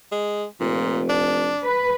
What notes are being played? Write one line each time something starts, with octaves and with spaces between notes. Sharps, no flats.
G#3
F1 A#2
D4
B4